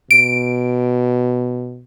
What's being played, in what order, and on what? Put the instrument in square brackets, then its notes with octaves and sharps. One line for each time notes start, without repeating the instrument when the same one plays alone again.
[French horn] B2 [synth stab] D7